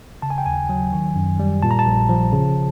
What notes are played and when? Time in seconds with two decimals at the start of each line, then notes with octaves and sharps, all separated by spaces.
0.22 C#3 A5
0.30 G#5
0.38 G5
0.46 D#2 G#5
0.69 F#3
0.93 D#3
1.16 F#2
1.40 G3
1.63 A#2 A5
1.71 A#5
1.79 A5
1.86 A#1
2.09 F3
2.32 C#3